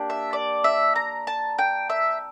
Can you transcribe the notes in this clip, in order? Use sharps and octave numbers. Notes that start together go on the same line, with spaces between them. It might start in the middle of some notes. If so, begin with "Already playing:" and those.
Already playing: A#3 D4 G4
E5
D5
E5
A#5
A5
G5
E5